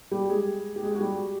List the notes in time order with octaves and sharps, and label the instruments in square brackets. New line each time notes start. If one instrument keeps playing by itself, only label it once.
[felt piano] G3 G4
G#3 G#4
G4
G#3 G#4
F#4
G3 G4